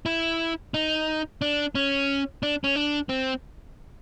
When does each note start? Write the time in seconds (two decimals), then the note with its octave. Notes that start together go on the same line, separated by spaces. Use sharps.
0.06 E4
0.74 D#4
1.42 D4
1.75 C#4
2.43 D4
2.64 C#4
2.76 D4
3.09 C4